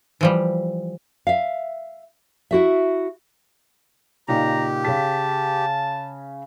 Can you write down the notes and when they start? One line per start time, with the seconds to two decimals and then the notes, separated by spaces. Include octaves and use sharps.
0.21 E3 F3 G3
1.27 E5 F5
2.51 E4 F#4 E5
4.28 A#2 C#3 D#4 G4 A#5
4.85 C#3 G#4 A5 B6